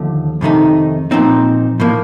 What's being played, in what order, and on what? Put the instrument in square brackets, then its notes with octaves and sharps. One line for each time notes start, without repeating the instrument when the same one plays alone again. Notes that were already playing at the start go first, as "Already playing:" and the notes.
Already playing: [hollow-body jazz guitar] D#2 D3 F3 A3
F2 C3 D#3 A3 D#4
A#2 F3 C4 D#4
A2 F3 A#3